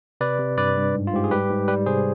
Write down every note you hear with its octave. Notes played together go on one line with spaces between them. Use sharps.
C3 B4 D5
C3
G2 B4 D5
G2
G#2
F4
G#2 G4
G#4
G3 G4 B4
G#2
G3 G4 B4
C3 G#4 C5